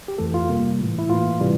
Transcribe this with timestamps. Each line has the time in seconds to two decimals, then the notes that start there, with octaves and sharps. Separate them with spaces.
0.08 G4
0.18 F2 E3 A3 A4
0.34 F4
0.49 C3 G3 A#3
0.80 A2 E3 A3
0.99 E4
1.09 A2 E3 A#3 F4
1.40 C3 E3 G3